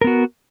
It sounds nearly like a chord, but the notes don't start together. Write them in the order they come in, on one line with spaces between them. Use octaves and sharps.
A#4 B3 F#4